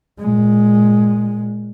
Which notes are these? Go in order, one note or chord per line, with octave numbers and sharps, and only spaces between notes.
A#2 G#3